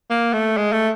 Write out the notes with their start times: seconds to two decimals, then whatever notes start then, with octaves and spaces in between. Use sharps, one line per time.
0.10 A#3
0.33 A3
0.57 G#3
0.72 A3